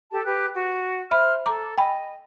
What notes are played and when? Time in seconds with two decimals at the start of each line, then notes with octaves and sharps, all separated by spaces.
0.11 G4 A4 A5
0.24 G4 B4 F#6
0.55 F#4
1.11 C5 E5 B5 F6
1.46 A4 A#5 D6
1.78 D#5 G5 G#5 B5